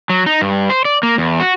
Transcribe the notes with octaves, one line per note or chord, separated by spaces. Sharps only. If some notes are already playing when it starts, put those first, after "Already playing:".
F#3
D#4
G2
C5
D5
A#3
E2
F#4